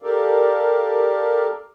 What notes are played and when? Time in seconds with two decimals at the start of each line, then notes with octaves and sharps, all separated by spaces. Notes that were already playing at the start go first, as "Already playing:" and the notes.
0.02 G4 A4 A#4 D5 F5